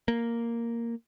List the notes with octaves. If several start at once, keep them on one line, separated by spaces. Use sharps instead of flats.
A#3